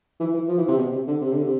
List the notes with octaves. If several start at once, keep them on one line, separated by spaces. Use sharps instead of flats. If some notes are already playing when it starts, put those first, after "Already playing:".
E3
E3
F3
E3
C3
B2
C3
D3
C3
D3
C3